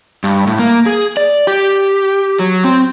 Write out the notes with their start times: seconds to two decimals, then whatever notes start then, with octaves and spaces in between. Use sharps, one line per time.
0.24 G2
0.47 A2
0.59 A#3
0.86 G#4
1.17 D5
1.47 G4
2.39 F#3
2.64 C4